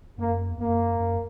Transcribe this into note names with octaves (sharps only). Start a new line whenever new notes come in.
F#2 A#3
E2
F#2 A#3
F#2